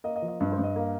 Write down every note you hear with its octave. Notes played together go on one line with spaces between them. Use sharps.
A#3 D#5
D#5
F3
D#5
G2 D#5
C5
G2
D#5
A#3